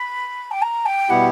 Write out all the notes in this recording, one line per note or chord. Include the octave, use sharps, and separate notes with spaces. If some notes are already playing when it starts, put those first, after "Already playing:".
Already playing: B5
G5
A#5
G5
B2 G3 B3 E4 G4 F#5